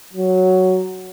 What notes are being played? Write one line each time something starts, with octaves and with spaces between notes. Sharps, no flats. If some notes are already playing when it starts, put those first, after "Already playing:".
F#3